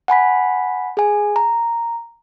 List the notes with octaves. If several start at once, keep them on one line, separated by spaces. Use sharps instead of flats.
F#5 G#5 B5 B6
G#4 G#5
A#5